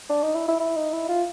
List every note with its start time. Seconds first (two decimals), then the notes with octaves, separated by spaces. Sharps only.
0.10 D4
0.23 D#4
0.35 E4
0.48 E4
0.60 E4
0.77 D#4
0.93 E4
1.09 F4